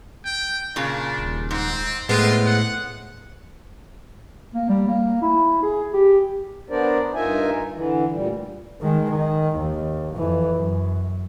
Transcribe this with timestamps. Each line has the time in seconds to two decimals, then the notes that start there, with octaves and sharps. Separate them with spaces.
0.25 G5
0.76 A#2 C#3 D4
1.19 D#1
1.51 G#2 C4
2.09 A2 G#3 B3 C4 F4
2.46 F#5
4.54 A#3
4.69 G3
4.87 A#3
5.22 E4
5.62 G#4
5.93 G4
6.70 B3 D4 A#4 C5 D5
7.15 G2 D#4 F4 A#4 E5 G#5
7.73 D3 E3
8.12 D2 A#2 G3
8.81 D#3 G#3
9.12 D#3
9.56 D#2
10.13 F2 E3
10.54 F#2